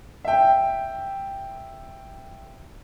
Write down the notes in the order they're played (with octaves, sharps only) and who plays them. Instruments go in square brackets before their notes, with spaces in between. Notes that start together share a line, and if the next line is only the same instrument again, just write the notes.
[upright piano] E5 G5